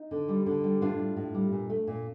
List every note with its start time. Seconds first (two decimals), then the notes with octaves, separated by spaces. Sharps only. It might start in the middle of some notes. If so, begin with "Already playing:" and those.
Already playing: D#4
0.11 D3
0.28 G3
0.46 D3
0.64 G3
0.81 A2 D4 F4
0.99 G3
1.17 A2
1.34 G3
1.52 A#2
1.70 A3
1.87 A#2